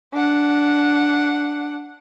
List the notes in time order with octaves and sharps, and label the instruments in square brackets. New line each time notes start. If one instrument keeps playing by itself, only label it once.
[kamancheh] D4 F#5